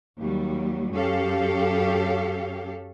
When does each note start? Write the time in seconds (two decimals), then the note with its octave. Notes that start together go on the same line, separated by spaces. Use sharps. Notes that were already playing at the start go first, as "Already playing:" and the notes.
0.18 D#2 F#3 G3
0.93 F#2 C#4 G4 A4 F5